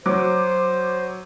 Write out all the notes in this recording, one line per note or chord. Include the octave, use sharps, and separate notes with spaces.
F#3 C5 D6